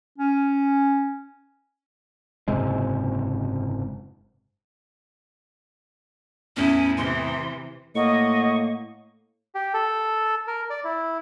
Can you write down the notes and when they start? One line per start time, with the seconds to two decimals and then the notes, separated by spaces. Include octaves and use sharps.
0.18 C#4
2.48 F#1 G#2 C3 G#3
6.57 E2 A2 C#4 E4
6.97 C3 E3 C6
7.95 A2 A#3 D#5 F#5 C#6
9.55 G4
9.74 A4
10.47 A#4
10.70 D5
10.84 E4